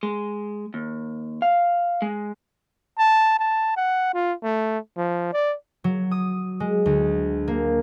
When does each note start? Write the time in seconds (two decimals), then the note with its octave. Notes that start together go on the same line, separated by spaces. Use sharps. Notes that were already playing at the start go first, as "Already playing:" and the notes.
0.03 G#3
0.74 D#2
1.42 F5
2.02 G#3
2.99 A5
3.39 A5
3.76 F#5
4.14 F4
4.43 A3
4.97 F3
5.33 D5
5.84 F#3
6.11 D#6
6.60 G#3
6.86 D2
7.48 A#3